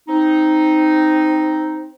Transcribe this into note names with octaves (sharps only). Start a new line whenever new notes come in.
C4 D#4